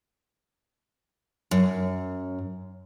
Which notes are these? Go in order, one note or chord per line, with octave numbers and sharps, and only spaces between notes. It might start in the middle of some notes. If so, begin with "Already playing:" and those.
F#2